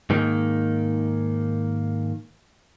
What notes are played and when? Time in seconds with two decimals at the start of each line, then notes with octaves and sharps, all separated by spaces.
0.10 G#2 D#3 A#3